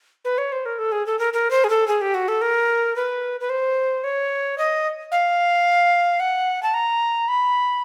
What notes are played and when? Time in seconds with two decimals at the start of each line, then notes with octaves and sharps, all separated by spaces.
0.25 B4
0.38 C#5
0.52 C5
0.65 A#4
0.78 A4
0.92 G#4
1.06 A4
1.19 A#4
1.33 A#4
1.50 C5
1.64 G#4
1.69 A4
1.87 G#4
2.01 G4
2.14 F#4
2.28 A4
2.41 A#4
2.96 B4
3.40 B4
3.49 C5
4.04 C#5
4.58 D#5
5.11 F5
6.20 F#5
6.63 A5
6.74 A#5
7.28 B5